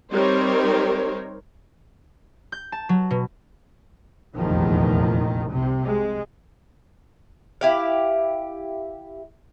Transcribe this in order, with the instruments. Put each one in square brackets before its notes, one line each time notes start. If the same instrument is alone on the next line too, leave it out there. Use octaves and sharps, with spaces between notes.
[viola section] G3 C4 D#4 A#4 C5 C#5
[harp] G6
A5
F#3
B2
[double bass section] F1 A#1 E2 D#3 F3
C2 C3
G#3
[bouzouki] E4 G4 F5